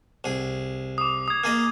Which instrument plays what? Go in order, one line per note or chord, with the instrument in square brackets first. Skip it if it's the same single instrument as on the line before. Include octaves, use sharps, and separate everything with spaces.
[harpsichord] C2 G#4
[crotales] D6 D#6
D#6 G#6
[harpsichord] A#3 G#4 D#5